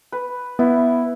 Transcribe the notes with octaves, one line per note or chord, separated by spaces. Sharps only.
B4
B3 E4